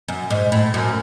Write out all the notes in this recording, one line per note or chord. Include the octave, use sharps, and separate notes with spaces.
F#2
G#2
A2
F#2